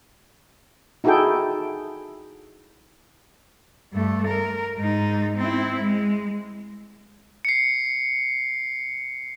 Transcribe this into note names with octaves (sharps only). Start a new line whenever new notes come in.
D#4 E4 F#4 G#4 A4 G5
G2 A3
A#4
G#2 D#4
C4 E4
G#3
C7 C#7